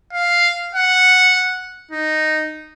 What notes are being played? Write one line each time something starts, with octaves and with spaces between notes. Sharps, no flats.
F5
F#5
D#4